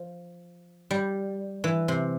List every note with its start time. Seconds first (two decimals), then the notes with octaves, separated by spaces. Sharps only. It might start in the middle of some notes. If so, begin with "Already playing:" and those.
Already playing: F3
0.91 G3
1.64 E3
1.88 C3